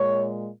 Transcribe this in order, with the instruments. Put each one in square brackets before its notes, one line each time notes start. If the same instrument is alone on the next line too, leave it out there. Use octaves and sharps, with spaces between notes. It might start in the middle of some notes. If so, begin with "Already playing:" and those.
Already playing: [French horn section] A#2 G#3 C#5